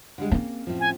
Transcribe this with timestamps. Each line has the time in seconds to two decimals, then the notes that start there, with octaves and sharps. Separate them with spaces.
0.18 D3 G3 G#3
0.31 A#3 C4 C#4
0.67 A2 F3
0.80 G#5